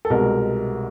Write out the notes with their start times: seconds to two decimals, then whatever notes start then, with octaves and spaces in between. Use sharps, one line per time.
0.05 A4
0.10 C2 B2 G#3 A#4